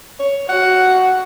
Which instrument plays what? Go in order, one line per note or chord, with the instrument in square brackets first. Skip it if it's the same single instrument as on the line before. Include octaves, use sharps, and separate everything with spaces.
[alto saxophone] C#5
[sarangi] F#4 [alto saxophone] F#5